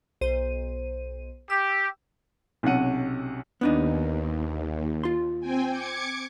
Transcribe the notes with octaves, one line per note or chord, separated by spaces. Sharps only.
B1 C5 D#7
G4 E6
B1 C3 C#4 F#5 D#7
D#2 B3 D4 D#4
F4 C6
C4 G5 G#5
D6 G#6 C#7